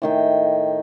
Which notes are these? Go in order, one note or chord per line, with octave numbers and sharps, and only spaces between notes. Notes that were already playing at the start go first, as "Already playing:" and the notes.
A2 D#3 G5